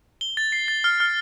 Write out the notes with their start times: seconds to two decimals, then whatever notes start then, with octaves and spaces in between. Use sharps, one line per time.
0.21 G7
0.37 A6
0.52 C7
0.68 A6
0.84 F6
1.00 F6